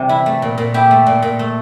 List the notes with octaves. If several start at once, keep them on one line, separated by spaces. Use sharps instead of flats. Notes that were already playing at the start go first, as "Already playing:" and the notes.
Already playing: C3 E3 G3 D4
E4
A3
A#2
A#2
E4 G4
A3
A#2
A#2
A3